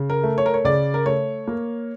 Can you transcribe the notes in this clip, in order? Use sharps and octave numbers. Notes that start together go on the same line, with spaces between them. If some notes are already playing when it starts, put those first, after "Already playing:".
Already playing: C#3
A#4
A3
C#5
A#4
C#5
C#3 D5
A#4
A3 C#5
A#3